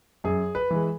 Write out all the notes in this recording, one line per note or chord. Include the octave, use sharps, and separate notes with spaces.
F#2 G#4
B4
E3 G#3